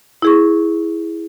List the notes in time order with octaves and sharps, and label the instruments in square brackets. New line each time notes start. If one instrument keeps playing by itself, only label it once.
[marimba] E4 G#4 C#6